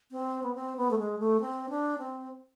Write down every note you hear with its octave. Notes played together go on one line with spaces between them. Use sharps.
C4
B3
C4
B3
A3
G#3
A3
C4
D4
C4